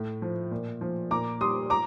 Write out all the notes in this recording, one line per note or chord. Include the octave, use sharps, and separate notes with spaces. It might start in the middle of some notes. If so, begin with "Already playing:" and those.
Already playing: A2
F3
A#2
F3
A#2 A#5 D6
G3 C6 D#6
A#5 D6